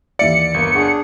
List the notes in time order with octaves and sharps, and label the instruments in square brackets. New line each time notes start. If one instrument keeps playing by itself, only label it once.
[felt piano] D#2 E3 E5 [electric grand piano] D5 [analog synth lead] C#7
[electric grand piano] G1 [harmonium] A#3
[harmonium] D4 G#4 [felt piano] F#5 C#6